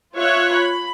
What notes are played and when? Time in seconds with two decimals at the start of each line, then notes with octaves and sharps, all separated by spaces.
0.17 F4 C#5 E5 F#6
0.56 B5